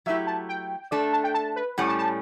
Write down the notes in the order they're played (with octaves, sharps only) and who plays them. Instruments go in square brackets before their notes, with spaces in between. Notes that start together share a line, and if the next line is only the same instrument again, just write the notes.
[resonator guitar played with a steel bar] F#3 A3 E4 G4 [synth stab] E5
[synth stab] A5
G5
[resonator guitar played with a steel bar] A3 D4 A4 [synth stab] D5
[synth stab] A5
G5
A5
B4
[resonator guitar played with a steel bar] A2 G3 C#4 [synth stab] F#5
[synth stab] A5
A5